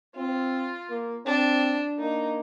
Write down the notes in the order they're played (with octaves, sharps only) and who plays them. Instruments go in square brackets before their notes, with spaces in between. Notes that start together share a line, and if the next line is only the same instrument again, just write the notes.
[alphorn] C4 [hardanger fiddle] F4
[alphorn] A#3
[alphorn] C4 [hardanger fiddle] D4
[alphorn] A#3 [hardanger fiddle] D#4